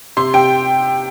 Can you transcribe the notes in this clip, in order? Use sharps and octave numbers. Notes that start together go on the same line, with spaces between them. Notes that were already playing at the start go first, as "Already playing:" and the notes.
C3 C6
C3 G5